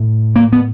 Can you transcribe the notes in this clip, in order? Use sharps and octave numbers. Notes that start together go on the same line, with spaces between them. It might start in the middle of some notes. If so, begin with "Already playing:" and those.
Already playing: A2
A#3
B3